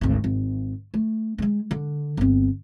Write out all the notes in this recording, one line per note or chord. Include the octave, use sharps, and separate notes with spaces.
G#1 D2
G#1
A3
G2 G#3
D3
G1 C4